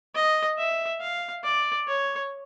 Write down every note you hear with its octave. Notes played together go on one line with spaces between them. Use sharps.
D#5
E5
F5
D5
C#5